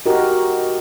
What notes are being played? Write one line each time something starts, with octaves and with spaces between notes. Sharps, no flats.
D#4 F#4 G4 A#4